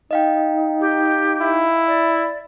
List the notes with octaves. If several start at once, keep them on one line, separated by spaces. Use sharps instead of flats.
D#4 D#5 F5 G5
G4
E4
D5